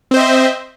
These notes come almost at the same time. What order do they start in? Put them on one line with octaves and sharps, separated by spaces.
C4 C5 D#5 E5